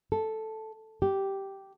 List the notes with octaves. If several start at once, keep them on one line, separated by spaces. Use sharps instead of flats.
A4
G4